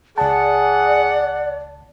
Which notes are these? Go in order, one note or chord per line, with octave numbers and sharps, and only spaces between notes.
C#2 G#4 D5 F#5 A5